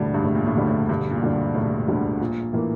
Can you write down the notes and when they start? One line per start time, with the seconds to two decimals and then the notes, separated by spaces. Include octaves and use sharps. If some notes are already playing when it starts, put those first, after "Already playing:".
Already playing: E1 D2 A2 D3 G3 D4
0.14 G2
0.24 E1 A2
0.35 A#2
0.46 A2
0.57 D2 D3 G3 D4
0.67 A2
0.89 E1 G2
1.11 A#2
1.22 D2 D3 G3 D4
1.55 E1 A2
1.88 D2 D3 G3 D4
2.20 A#1 A#2
2.53 A2 E3 A#3 F4